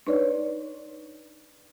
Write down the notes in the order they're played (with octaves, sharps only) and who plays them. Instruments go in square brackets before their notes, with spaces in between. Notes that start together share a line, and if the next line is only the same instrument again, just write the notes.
[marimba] D4 D#4 B4 C#5 D5